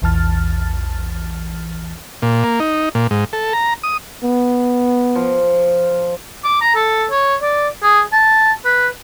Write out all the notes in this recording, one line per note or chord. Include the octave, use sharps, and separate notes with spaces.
A#1 E2 E3 A5 F6 A6
A#2
A#3
D#4
A#2
G#2
A4
A#5
D#6
B3
F3
D6
A#5
A4
C#5
D5
G#4
A5
B4